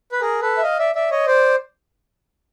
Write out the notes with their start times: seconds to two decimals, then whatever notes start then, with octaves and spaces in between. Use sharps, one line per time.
0.12 B4
0.21 G#4 A#4
0.42 A4 B4
0.57 E5
0.63 D#5 F5
0.79 D5 E5
0.95 D5 E5
1.11 C#5 D#5
1.26 C5 D5